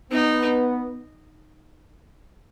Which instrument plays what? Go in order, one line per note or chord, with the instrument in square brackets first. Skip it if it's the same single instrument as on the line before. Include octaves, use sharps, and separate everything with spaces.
[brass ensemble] B3 [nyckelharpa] D#4